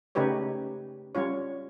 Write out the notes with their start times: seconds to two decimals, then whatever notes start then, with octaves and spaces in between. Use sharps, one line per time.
0.15 C#3 A3 D#4 G4 B4 C#5
1.15 G3 C#4 F4 C#5